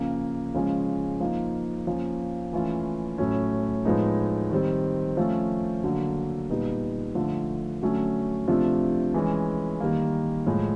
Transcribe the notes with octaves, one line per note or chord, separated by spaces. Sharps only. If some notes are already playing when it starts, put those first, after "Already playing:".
Already playing: C#3 F3 A#3
C#3 F3 G#3 C#4
F3 A#3 D#4
F3 A#3 C#4
E3 A3 C#4 F4
A2 F#3 A3 C#4
A2 F3 G#3 B3 D#4
D#3 G3 C4
F3 A3 C#4
D3 F#3 A#3
A#2 G3 B3 D#4
D3 F3 A3
D3 F#3 A3 C#4
C3 F3 A3 D4 F4
E3 G#3 C#4
D#3 G3 A#3
A2 F3 G#3